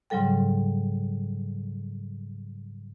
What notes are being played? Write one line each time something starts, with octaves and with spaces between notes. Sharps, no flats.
G#2 C#3 F#3 G3 A4 G5